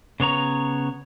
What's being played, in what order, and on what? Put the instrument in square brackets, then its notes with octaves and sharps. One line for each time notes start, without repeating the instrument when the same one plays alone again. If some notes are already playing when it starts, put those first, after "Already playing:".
[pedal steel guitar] C#3 B3 C#5 A#5